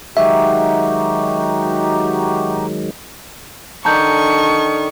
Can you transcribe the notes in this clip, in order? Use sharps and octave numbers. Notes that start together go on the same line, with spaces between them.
D#3 F#3 G#3 D#4 F#4 G4 E5
D3 D#3 D4 A5 A#5 C#6 G6